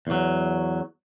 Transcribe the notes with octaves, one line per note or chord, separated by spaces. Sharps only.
E2 F#3